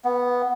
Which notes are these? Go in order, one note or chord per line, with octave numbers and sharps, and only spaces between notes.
B3